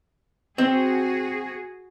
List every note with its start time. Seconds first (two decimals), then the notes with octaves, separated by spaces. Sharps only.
0.58 C4 F#4 G#4